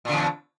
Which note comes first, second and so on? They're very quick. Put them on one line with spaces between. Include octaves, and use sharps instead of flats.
A#2 D3 E2